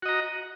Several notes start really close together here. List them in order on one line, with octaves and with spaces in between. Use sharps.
F#4 D#5 A#5